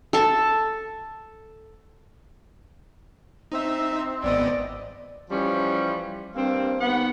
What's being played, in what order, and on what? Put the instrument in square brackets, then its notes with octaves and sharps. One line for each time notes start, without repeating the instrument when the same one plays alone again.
[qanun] A4 A5
[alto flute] C4 [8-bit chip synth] D#4 E5
[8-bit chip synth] G#1 B3 D#5 [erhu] D5
[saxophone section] E3 F3 G3 C#4 G4
G2 A#3 C4
D#2 B3 F#5